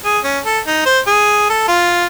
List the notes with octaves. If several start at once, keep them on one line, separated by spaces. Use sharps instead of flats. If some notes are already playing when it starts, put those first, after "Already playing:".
G#4
C#4
A4
D#4
C5
G#4
A4
F4